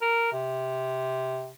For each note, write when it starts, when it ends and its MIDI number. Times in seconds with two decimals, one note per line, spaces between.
0.02 0.31 70
0.33 1.50 48